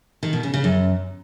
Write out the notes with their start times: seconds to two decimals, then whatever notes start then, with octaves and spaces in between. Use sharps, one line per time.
0.23 D#3
0.33 B2
0.43 C#3
0.54 C#3
0.64 F#2